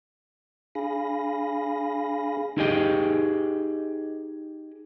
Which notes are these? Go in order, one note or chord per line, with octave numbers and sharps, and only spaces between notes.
D4 G#4 F5 G#5 B5 A#6
D#4 E4 G4 G#4 D#5 G5